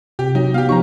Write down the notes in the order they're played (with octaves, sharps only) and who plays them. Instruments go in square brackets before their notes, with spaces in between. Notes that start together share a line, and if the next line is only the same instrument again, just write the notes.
[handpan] C3 [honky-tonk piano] G4
[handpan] F#3 [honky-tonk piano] D#4
[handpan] B3 [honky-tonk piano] G4 F5
[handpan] F3 D#4 G4 [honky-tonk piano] A#5 C#6